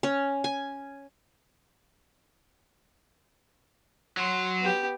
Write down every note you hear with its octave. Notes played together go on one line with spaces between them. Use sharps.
C#4
G#5
F#3 C6
B3 G4